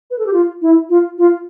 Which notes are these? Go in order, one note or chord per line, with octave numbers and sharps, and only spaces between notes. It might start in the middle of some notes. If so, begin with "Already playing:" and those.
B4
A4
G4
F4
E4
F4
F4